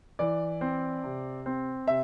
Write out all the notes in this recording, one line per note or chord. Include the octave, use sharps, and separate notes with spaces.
E3 D5
C4
C3
C4
C3 E5